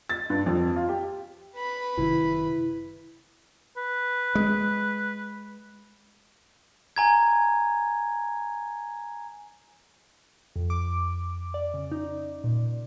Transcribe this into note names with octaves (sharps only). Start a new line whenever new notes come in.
A6
G2
F2
F4
G4
B4 B5
F#1 C3 D#3 E4
B4
G#3
G#5 A#5 G#6
F2
D6
D5
C#3
D#4
A#2